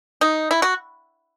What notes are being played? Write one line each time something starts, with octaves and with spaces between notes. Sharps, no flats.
D#4
E4
F#4